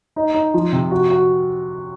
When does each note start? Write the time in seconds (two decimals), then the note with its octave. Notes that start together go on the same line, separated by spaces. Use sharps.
0.16 D#4
0.34 D#4
0.54 F3
0.72 C3
0.91 F#4
1.10 F#4